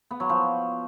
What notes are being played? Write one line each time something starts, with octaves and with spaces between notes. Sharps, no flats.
B3
F#3
F3